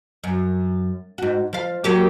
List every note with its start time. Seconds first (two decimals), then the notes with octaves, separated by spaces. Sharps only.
0.24 F#2
1.18 G#2 F#4
1.53 F3 F5
1.84 F#3 A#3 G4